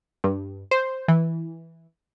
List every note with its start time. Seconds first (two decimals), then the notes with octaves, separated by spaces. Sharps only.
0.24 G2
0.71 C5
1.08 E3